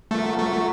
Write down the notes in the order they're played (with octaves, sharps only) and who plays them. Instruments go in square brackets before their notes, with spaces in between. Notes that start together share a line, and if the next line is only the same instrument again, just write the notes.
[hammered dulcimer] F3 [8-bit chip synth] A3
[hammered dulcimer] F#3
[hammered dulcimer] F3 [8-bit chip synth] A3
[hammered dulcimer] F#3